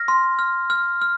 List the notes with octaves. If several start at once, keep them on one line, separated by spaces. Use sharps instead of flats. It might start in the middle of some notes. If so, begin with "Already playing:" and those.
Already playing: F6 A#6
C6
F6
F6
F6